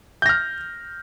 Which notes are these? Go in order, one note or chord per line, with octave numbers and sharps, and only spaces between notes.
F6 G6 A#6